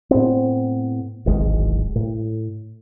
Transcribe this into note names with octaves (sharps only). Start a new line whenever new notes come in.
A2 B3 C4
D1 G#1 G#3
A2